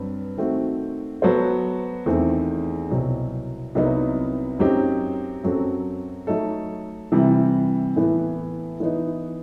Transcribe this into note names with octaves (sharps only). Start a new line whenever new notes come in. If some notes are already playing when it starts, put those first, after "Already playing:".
Already playing: G2 F#3 C4 B4
D#3 A3 C4 F#4
F#3 B3 F#4 A4 C5
E2 D#3 A3 C4
C2 B2 F#3 C4
C2 C3 F#3 B3 D#4
F#2 F#3 C4 D#4 G4
F#2 F#3 C4 F#4 A4
F#3 A3 D#4 A4
C3 E3 G3
A2 E3 B3 E4
E3 B3 D#4